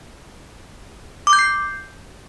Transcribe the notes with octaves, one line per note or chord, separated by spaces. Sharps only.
D6
G6
C7